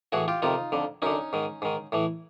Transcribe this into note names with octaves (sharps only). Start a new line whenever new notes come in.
A2 E3 F#4 G#4
F4 G4
F2 C3 D#3 D#4 F4
F2 D3
F#2 D3 C#4 D#4
G#2 D#3
G#2 D#3
A2 E3